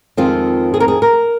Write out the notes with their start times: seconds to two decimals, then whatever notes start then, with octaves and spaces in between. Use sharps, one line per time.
0.17 F2 D#3 G#3 C4 F4
0.74 G#4
0.80 A#4
0.88 G#4
1.02 A#4